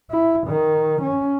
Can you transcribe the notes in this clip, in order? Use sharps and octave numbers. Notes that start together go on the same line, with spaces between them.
E4
D#3
C#4